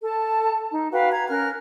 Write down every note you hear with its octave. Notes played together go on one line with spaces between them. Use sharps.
A4 A5
D#4
F#4 B4 F5 G5
A#5 G#6
C#4 A#4 F6 F#6